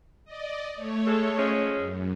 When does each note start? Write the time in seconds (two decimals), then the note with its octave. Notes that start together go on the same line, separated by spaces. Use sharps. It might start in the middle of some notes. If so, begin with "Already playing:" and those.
0.25 D5 D#5
0.76 A3 C#5
1.06 G#3 A4
1.38 F3 G#3 C#4
1.75 F#2